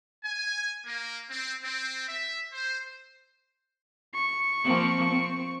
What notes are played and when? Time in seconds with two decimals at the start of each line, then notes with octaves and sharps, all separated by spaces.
0.25 G#5
0.86 A#3
1.30 C4
1.64 C4
2.08 E5
2.52 C5
4.14 C#6
4.64 F3 A#3 C4
5.11 C4